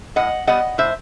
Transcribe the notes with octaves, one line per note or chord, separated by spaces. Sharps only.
A2 D#5 F#5
G3 B3 D#5 F#5
A2 C5 E5